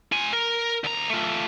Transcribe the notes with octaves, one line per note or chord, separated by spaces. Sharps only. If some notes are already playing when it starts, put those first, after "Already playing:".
F4 G#5
A#4
D2 A#5
A3 F4